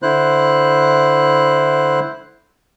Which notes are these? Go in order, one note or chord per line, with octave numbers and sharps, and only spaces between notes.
D3 E4 C5 F#6